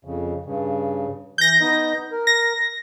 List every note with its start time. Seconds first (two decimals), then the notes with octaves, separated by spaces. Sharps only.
0.05 F2 C#3
0.45 G2 C#3
1.38 E3 G6 A#6
1.61 B3 D#4 D#5
2.12 A#4
2.27 A#6